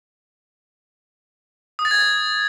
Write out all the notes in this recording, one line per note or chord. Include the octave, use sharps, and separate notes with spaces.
D#6
A6
G#6